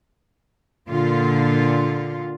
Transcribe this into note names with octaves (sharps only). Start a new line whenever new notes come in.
A#2 D3 F4